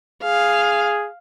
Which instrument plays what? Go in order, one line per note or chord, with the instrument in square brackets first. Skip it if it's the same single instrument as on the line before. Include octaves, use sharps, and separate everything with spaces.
[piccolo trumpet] G#4 [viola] F5